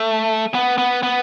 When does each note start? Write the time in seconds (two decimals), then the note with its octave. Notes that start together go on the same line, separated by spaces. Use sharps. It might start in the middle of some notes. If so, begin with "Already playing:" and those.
Already playing: A3
0.54 B3
0.78 B3
1.03 B3